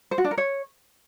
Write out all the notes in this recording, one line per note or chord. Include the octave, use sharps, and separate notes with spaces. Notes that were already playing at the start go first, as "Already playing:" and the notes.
C5
F#4
D4
A#4
C#5